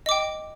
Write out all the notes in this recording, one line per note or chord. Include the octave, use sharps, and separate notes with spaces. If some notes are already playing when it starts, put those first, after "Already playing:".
D#5 G5 D6